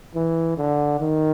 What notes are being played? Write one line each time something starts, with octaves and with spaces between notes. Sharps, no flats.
E3
D3
D#3